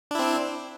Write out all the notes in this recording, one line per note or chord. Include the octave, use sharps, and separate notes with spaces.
C4 D4 E4